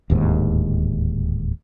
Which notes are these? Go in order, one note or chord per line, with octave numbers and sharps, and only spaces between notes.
D1 D#2 G#2